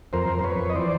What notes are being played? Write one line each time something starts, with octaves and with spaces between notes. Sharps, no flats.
F2 A#4 C5
F2
C5
F2 B4 C#5
F2
D#5
E3 C5 D5